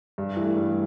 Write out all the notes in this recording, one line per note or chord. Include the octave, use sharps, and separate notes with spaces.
G2
E3 A3
G2